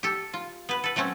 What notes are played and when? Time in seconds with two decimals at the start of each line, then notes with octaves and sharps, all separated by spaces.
0.03 G4 A4
0.34 F4
0.69 B3 B4
0.84 A4 B4
0.96 F#3 A3 C4 C#4